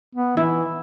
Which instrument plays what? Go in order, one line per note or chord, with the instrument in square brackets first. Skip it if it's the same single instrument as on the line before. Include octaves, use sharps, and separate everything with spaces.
[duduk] B3
[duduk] E3 [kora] E4